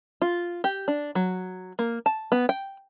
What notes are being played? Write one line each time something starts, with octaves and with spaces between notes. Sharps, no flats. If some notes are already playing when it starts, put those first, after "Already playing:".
F4
G4
D4
F#3
A#3
A5
B3
G5